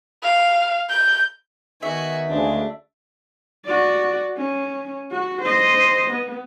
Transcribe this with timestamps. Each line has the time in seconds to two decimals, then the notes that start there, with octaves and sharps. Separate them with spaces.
0.23 F5
0.90 G6
1.83 D#3 B3 D#4 F#4 E5 G#5
2.28 D2 C#3 G#3 D4
3.65 F#4 D5
4.37 C#4
5.11 F#4
5.42 C5 D#5
6.11 B3